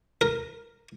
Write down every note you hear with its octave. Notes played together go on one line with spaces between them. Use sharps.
A#4